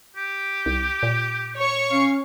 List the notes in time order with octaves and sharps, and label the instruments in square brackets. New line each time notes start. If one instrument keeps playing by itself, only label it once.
[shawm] G4
[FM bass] C2
A#2
[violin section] C#5 C#6
[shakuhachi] C#4 [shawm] F5